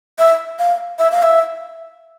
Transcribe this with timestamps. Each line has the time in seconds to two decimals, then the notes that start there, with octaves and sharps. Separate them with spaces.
0.19 E5
0.59 F5
0.99 E5
1.12 F5
1.23 E5